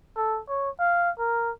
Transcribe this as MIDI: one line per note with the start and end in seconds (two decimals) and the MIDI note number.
0.16 0.40 69
0.49 0.70 73
0.79 1.11 77
1.19 1.51 70